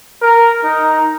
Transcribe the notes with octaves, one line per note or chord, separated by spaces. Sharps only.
A#4
D#4